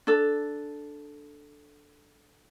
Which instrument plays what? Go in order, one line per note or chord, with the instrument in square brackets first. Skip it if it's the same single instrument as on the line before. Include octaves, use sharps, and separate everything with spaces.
[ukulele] D4 A4